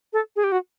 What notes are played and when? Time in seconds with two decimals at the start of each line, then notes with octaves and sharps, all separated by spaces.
0.13 A4
0.36 G#4
0.44 G4
0.52 F#4